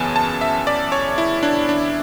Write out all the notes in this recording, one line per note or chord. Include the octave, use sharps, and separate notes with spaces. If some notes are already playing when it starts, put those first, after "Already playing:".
Already playing: F#2 C#3 E3 B3 G#5 A5
A5
E5
D5
C#5
E4
D4
D4